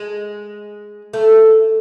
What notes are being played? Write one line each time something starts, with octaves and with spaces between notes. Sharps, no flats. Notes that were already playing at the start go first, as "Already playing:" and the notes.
Already playing: G#3
A3